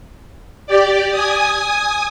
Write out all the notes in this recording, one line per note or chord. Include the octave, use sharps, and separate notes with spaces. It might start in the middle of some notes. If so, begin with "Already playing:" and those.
G4 D5
G#5 D#6